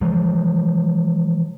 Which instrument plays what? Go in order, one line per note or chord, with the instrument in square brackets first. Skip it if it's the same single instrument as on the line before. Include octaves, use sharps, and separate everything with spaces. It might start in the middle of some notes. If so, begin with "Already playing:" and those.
[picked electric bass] E3 F3 G#3